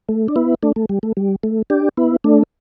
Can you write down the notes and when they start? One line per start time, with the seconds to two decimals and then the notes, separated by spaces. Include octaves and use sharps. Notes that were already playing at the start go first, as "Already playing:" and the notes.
0.09 A3
0.28 D4
0.36 B3 E4
0.63 A3 D4
0.76 A3
0.89 G3
1.03 A3
1.17 G3
1.43 A3
1.70 D4 G4
1.97 B3 E4
2.24 A3 D4